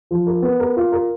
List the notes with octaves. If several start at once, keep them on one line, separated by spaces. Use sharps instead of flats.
F3
A#4
B3
A#4
F4
A#4